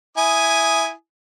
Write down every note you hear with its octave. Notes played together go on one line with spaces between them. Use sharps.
E4 G#5 D#6